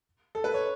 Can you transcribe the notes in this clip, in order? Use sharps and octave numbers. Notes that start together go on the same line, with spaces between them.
A4
B4
C#5